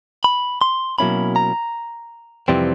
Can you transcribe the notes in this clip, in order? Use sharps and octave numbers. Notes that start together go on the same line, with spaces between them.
B5
C6
B2 F#3 A#3 C#4 E4 B5
A#5
F2 C3 E3 G3 C4